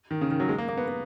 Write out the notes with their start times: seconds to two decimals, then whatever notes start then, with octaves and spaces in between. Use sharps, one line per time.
0.11 D#3
0.21 C#3
0.31 D#3
0.40 F#3
0.49 G#3
0.58 A#3
0.69 A#3
0.78 B3
0.88 B3